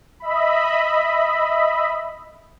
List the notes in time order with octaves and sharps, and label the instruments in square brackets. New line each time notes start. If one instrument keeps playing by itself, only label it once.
[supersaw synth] D#5 E5 B5